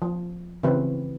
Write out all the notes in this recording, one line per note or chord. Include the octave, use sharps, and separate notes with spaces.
F3
C#3 E3 C4 B4